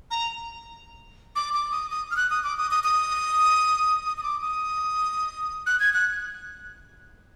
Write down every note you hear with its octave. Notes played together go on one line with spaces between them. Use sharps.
A#5
D6
D6
D#6
D#6
F6
F#6
D#6
D6
D#6
D#6
D#6
D#6
D#6
D6
D#6
F#6
G#6
F#6